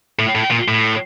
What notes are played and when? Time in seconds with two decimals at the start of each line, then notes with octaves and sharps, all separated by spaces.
0.19 A2
0.35 A2
0.51 A#2
0.68 A2